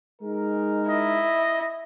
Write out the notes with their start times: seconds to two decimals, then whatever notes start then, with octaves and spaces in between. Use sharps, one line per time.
0.22 G#3 D#4 A#4
0.89 E4 D#5